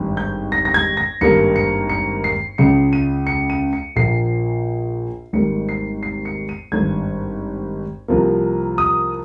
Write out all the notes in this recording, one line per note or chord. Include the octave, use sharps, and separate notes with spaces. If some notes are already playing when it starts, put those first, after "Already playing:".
Already playing: G#1 G2 G3
G6
A#6
A#6
G#6
A#6
G#1 G2 G3 A#3 C#7
C#7
C#7
C7
C#2 C#3 G#3 C#7
D#7
C#7
D#7
C#7
A#1 A#2 F3 C7
G#1 G#2 G3 A#3 C#7
C7
C7
C#7
D#7
G#1 G2 G3 G#6
C2 C3 F3 A#3
D#6